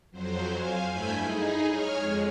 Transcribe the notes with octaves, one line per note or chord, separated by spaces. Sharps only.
F2 F#3 C5
F5 G#5
G2 A3 E4 G#5 B5 G6
D#4 G#4
C#5 G#5 F6
F2 G#3